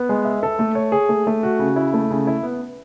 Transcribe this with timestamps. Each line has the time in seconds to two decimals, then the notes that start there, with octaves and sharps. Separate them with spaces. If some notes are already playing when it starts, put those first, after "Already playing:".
Already playing: B3
0.09 G#3
0.25 E5
0.43 A4
0.59 A3
0.75 C#5
0.92 G#4
1.09 A3
1.27 A3
1.43 F#4
1.59 C#3
1.76 E4
1.94 A3
2.11 C#3
2.27 E4
2.43 B3